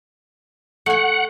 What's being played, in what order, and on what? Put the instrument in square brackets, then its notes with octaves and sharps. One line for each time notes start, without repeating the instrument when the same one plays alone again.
[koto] A3 G#5 [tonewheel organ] F#5